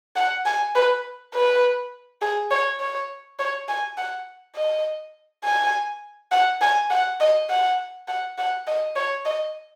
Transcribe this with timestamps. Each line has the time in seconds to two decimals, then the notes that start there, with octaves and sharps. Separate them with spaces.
0.16 F#5
0.46 G#5
0.75 B4
1.34 B4
2.22 G#4
2.51 C#5
2.80 C#5
3.39 C#5
3.69 G#5
3.98 F#5
4.56 D#5
5.44 G#5
6.32 F#5
6.62 G#5
6.90 F#5
7.20 D#5
7.50 F#5
8.08 F#5
8.38 F#5
8.67 D#5
8.96 C#5
9.25 D#5